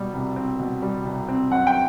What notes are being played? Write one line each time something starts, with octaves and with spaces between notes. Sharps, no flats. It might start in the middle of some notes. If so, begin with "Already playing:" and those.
Already playing: B2 G3
C2
C4
B2
G3
C2
C4
F#2 F#5
G5